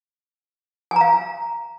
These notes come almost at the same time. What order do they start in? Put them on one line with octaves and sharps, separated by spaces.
G#5 A#5 F5